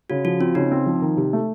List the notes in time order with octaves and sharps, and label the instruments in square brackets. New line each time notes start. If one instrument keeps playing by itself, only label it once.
[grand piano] C#3 [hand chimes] F#4
[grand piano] F3 [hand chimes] F#4
[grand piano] C4 [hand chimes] F4
[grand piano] C#3 [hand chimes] D#4
[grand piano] C4
F3
D#3
C3
A3